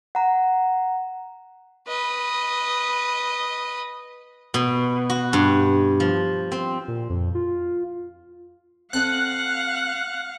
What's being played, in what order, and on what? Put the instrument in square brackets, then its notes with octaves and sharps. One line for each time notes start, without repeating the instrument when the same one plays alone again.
[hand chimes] F#5 A#5
[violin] B4 D#5
[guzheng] B2
F#4
G2
F3
C4
[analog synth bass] A#2
F2
F4
[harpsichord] C4 A4 D#5 [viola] F5 F#5 [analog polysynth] F#6